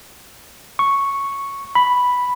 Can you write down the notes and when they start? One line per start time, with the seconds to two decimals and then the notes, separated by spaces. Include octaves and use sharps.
0.79 C#6
1.75 B5